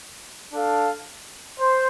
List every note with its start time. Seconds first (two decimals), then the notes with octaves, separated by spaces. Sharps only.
0.52 D4 A4 F5
1.58 C5